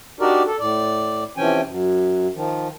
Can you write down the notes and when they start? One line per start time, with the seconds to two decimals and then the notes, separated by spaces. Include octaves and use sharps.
0.20 D4 D#4 F#4 G4 A#4 D5
0.46 A4
0.59 A2 D5
1.37 C3 E3 F3 C#4 G5 G#5
1.67 F#2
2.35 D#3 F3